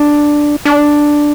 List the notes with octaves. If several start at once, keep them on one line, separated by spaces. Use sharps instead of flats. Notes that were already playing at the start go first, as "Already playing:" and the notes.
Already playing: D4
D4